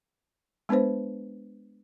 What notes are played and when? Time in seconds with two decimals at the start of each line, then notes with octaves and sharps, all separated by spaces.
0.69 G#3 B3 D4 B4 C5